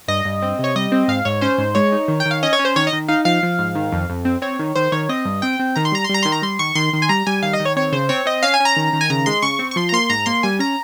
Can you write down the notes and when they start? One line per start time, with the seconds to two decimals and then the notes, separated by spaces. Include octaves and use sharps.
0.08 G2 D#5
0.25 G2
0.42 C4
0.59 C3 C#5
0.76 G3 D#5
0.92 C4
1.08 G#2 F5
1.25 G#2 C#5
1.41 C#4 C5
1.58 G#2
1.75 G#3 C#5
1.92 D#4
2.08 D#3
2.20 G5
2.26 D#3
2.31 F5
2.43 C#4 D#5
2.53 C#5
2.59 C#4
2.65 C5
2.76 D#3 C#5
2.87 D#5
2.93 D#3
3.08 D#4 F5
3.25 F3 F5
3.43 F3
3.59 G#2
3.75 D#3
3.92 F2
4.10 F2
4.25 C4
4.42 C4 C#5
4.59 D#3
4.75 D#3 C5
4.92 D#3 C#5
5.09 C4 D#5
5.25 G2
5.42 C4 G5
5.59 C4
5.76 D#3 A#5
5.85 C6
5.92 G3 A#5
6.04 C6
6.09 G3 A#5
6.23 D#3 C6
6.32 A#5
6.42 G3 C6
6.59 D#3 C#6
6.75 D#3 C6
6.93 D#3
7.02 G#5
7.09 G3 A#5
7.27 G3 G#5
7.43 D#3 F5
7.53 D#5
7.60 D#3
7.65 C#5
7.76 C4 C#5
7.92 C#3 C5
8.09 C4 C#5
8.26 C4 D#5
8.43 C#4 F5
8.54 G#5
8.60 C#4
8.65 A#5
8.76 D#3
8.93 D#3
9.01 G#5
9.10 C#3 A#5
9.26 G#3 C6
9.42 C#3 C#6
9.59 C4
9.71 C#6
9.76 F3 C6
9.89 A#5
9.92 A#3 C6
10.10 G#2 A#5
10.26 A#3 C6
10.43 G3 G#5
10.59 C#4 A#5